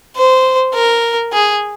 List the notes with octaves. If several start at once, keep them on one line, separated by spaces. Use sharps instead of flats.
C5
A#4
G#4